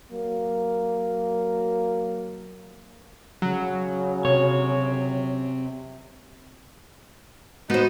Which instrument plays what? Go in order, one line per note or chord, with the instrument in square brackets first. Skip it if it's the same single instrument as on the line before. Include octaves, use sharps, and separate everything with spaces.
[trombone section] F#3 A#3
[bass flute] C#3 [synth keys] F#3
[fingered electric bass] C3 [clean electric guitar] C#5
[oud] B3 C5 [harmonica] D#4 [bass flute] F#4